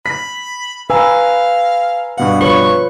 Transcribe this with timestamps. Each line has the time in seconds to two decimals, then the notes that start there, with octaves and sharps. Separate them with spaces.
0.06 B5 B6
0.90 B4 F5 G#5 A#5 E6
2.17 G2 B2 F5 F#5
2.41 F4 B4 C#5 C#6 F#7